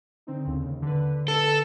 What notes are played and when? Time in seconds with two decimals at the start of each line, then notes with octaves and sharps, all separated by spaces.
0.27 D3 C4 D#4
0.45 D#2 C#3
0.82 D3 B4
1.28 A4